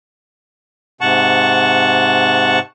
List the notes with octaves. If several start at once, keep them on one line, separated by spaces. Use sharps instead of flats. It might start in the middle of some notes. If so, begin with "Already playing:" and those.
G#2 C3 F#5 A5 C#6